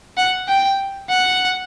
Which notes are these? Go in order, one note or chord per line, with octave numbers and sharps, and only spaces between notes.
F#5
G5
F#5